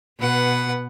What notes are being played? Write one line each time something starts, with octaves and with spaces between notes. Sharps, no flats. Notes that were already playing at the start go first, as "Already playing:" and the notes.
B2 B4 F#5